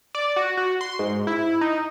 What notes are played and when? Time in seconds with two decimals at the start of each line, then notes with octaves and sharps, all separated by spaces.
0.15 D5
0.36 F#4
0.57 F#4
0.81 C6
0.99 G#2
1.27 E4
1.61 D#4